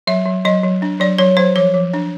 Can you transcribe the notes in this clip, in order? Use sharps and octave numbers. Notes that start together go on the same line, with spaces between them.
F#3 E5
F#3
F#3 D#5
F#3
D4
F#3 D5
F#3 C#5
F#3 C5
F3 C#5
F3
D4